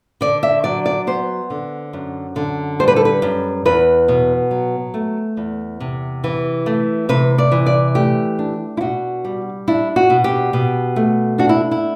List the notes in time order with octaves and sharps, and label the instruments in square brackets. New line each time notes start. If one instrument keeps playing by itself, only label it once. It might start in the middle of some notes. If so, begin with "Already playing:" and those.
[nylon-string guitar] D3 D5
E5
F#3 D5
D5
B3 C5
D3
F#2
D3
G3 C5
B4
A4
B4
F#2
E2 B4
B2
F#3
A3
E2
C3
E3
A3
C3 B4
D5
E3
D5
A3 G4
D4
E4
B2 F#4
G3
D4 E4
F#4
B2
G4
B2
A3
D4 F#4
E4
E4